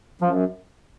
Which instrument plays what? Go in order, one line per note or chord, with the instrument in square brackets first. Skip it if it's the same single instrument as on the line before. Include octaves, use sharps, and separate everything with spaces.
[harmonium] F#2 [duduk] F3